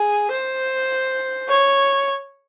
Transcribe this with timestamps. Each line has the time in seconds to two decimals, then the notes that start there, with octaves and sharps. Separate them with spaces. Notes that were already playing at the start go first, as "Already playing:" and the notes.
Already playing: G#4
0.31 C5
1.48 C#5